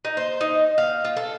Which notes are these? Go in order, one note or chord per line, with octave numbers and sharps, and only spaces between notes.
D#4
C5
D#4
F5
F4
A4